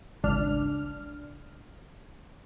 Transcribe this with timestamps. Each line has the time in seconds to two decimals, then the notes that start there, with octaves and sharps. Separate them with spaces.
0.24 G#1 C#2 D4 F6